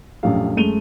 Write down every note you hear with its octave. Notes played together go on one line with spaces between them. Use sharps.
A#1 F#2 A3 G4 F5
F#2 G#3 A3 D#7 F7 G7